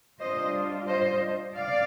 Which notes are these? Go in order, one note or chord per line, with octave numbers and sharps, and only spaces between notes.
G3 D4 F4 C5 D#5
C5 D#5
D5 F5